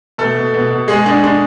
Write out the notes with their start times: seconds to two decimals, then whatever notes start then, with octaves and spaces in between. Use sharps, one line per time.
0.18 B2 A3 A4
0.36 B2
0.54 B2
0.70 B2
0.88 G#3 G#4
1.06 G#3 D4
1.23 G#3 D4